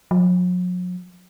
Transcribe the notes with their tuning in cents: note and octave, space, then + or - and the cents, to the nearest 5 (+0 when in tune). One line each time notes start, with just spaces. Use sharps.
F#3 -45